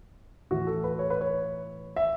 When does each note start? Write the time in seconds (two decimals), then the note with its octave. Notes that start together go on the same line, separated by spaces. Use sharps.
0.51 A2 E3 F#4
0.67 A4
0.84 B4
0.99 C#5
1.10 B4
1.21 C#5
1.96 E5